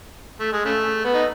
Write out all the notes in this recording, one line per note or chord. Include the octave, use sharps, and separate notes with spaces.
A3
G#3
C#3 A3
B3
D#4